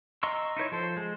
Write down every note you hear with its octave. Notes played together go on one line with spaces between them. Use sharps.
D#5 A#5 C6 C#6 E6
D#4 E4 C5 C#5
F3 A4 C5
G#3